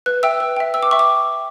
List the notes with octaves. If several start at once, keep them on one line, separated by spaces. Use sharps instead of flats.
B4 F#6
E5 G5 E6
B4
E5 G5
B4 E6
D6
E5 G5 C#6
D6